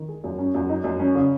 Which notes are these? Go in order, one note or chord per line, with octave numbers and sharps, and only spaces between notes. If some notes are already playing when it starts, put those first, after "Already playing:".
Already playing: D#3
G#4
F#2
C#4
F#2
D#4
F#2
C#4
C#3